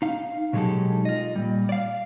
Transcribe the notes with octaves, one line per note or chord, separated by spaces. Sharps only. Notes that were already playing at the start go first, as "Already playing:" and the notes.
D#4 F5
B2 F#3 G#3 D#4 G4 A4
F4 D#5
A#2 G3
D5 F5